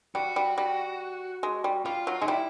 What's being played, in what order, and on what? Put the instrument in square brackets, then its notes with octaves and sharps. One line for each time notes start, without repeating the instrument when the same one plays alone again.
[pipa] G3 [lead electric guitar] F#4
[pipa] G3
G3
G#3
G3
[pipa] G3 [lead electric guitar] F4
[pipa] F#3
[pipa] G#3 [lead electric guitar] D#4
[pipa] G3 [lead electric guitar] E4